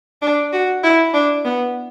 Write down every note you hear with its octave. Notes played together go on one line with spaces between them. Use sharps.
D4
F#4
E4
D4
B3